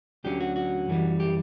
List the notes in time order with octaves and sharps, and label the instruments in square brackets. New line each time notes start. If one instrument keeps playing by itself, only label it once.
[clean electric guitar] D2 D3 F#3 C#4 G4
F#4
F#4
F#2 E3 G3
G4